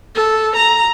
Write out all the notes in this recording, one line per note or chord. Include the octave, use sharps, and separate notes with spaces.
A4
A#5